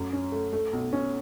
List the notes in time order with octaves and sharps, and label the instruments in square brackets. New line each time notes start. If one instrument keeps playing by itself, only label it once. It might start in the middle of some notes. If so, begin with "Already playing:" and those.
Already playing: [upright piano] F#2 A3
C#4
A3
A3
B1
C#4